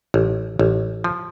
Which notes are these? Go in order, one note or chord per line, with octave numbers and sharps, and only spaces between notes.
A1
A1
F3